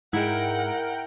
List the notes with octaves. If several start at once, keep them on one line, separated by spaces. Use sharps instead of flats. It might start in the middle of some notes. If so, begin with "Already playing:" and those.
G#2 G#3 E4 A#4 F#5 G5 D7